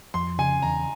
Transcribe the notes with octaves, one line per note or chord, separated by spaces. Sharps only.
F2 C6
C#3 G#5
E2 A#5